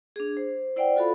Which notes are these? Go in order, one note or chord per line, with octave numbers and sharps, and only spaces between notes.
D4 G#4
C5
E4 C5 D5 F#5 G5
F4 F#4 A4 F5 B5